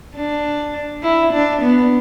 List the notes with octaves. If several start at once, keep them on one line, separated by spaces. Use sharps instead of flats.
D4
E4
D4
B3